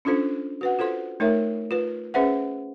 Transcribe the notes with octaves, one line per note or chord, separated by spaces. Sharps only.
C#4 D4 F4 A4 C5
F#4 B4 F#5
F4 A4 C5 C6
A3 D#4 A#4 C#5 E5
F4 B4
C#4 G#4 B4 C5 E5 F#5